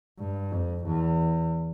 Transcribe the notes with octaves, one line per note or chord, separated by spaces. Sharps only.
G2
F2
E2